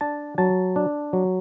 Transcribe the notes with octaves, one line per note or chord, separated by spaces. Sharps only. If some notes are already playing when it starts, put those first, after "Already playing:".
D4 A5
F#3 A5
D4
F#3